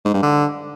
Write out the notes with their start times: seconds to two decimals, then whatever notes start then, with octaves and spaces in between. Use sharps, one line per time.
0.05 G#2
0.14 G2
0.23 D3